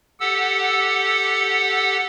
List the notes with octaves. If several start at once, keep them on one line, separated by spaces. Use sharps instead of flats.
G4 A4 F#5 E6